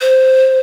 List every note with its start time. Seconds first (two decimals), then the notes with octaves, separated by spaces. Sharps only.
0.01 C5